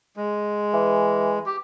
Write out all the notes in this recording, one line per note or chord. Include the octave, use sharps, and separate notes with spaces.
G#3
E3
G4